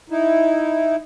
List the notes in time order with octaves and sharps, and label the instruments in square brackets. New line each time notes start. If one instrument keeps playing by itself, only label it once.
[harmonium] D#4 E4